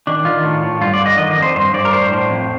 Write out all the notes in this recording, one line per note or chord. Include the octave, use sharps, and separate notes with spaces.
D#3 D4
D#3 F4
A2
A2
G2 F4
D5
D3
D#5
D#3 D#5
D#5
F2
C5
G2 C5
G2 D5
A#4
A2 C5
A2
F2